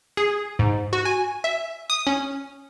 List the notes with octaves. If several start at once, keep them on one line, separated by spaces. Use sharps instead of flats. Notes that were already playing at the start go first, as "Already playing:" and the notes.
G#4
G#2
F#4
G#5
E5
D#6
C#4